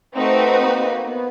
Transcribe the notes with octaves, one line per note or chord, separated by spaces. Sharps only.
A3 C4 D#4 F#4 B4
A#3
B3